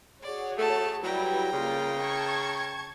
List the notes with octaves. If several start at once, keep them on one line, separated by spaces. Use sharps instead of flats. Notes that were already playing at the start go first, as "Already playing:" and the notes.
F#4 G#4 C#5 D5
A3 A5
F#3 G3 E4 B4 G5 A#5
C#3 A#3 F4
A5 C#6 G#6